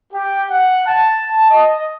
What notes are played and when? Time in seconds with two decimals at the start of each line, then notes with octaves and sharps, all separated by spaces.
0.13 G4
0.50 F#5
0.87 A5
1.50 D#5